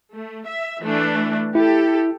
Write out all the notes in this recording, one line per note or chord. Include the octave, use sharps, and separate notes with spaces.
A3
E5
E3 A3 D4
E4 G4 A4